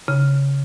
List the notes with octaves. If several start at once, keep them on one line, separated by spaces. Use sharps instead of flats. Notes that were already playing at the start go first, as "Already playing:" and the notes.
C#3